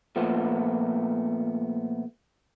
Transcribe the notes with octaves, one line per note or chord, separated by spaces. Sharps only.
A#2 F3 A3 B3